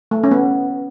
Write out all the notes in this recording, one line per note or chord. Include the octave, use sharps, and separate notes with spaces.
A3
C#4
B3